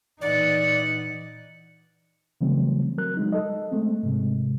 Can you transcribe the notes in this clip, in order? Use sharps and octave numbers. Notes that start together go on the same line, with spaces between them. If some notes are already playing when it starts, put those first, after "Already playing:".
A#2 E3 D#4 D5 F#5
C#3 E3 F#3 G3 A3 C4
F#3 A#4 F#6
F#3 G#3 D#4
A4 D#5
G#3 A3 C4
G#2 C3 G#3